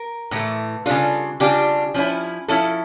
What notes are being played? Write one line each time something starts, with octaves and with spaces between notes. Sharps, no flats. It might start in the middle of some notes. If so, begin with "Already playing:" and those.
Already playing: A#4
A2 E3 A3
C#3 G3 D4 F4 A4
C#3 G3 D4 F4 G4
F3 C#4 E4
F3 C#4 E4 A4